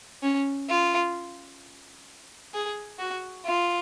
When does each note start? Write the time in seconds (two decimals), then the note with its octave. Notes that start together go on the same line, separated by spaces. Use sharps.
0.23 C#4
0.69 F4
2.54 G#4
2.99 F#4
3.45 F4